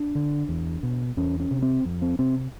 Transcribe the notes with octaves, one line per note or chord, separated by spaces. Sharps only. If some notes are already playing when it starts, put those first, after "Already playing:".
Already playing: D4
D3
E2
B2
E2 C#4
C#4
C3
C4
F2
C4
C3 C4